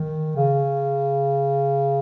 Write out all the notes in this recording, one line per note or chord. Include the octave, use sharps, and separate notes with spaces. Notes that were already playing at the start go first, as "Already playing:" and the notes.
Already playing: D#3
C#3